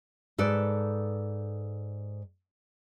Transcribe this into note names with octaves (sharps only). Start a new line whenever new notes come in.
G#2 A4 B4 D5